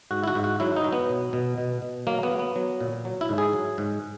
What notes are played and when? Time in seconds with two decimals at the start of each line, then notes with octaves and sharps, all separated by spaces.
0.11 G#2 F#4
0.24 E4
0.28 F#4
0.35 G#2
0.44 F#4
0.60 F#3 E4
0.76 D#4
0.84 F#3
0.93 B3
1.09 B2
1.33 B2
1.58 B2
1.82 B2
2.07 F#3 A#3
2.23 B3
2.31 F#3
2.39 B3
2.56 F#3
2.81 A#2
3.05 F#3
3.21 E4
3.29 G#2
3.38 G#4
3.53 F#3
3.78 G#2